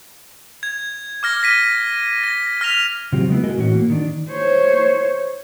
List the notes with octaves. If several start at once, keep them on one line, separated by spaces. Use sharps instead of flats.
G#6
D6 F6 A#6
F6 A#6 B6 D#7
A#6
F6 A#6 B6 F7
C#3 F#3 C4 F4 G4
G#3 B3 E4
G#3 F#4 G#4 A#4 D#5
A2 E3 C#4 F#4
A#3
D#3 D4
C5 C#5